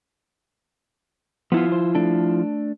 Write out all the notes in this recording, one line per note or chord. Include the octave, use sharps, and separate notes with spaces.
F3 B3 E4 F4
C5
A3 D4 A4